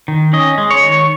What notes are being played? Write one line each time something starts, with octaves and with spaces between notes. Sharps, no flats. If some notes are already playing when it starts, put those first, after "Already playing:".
D#3
C#4 D#5
G#3
C#5
D#3